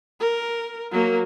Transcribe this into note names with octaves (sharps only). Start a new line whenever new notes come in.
A#4
F#3 A#3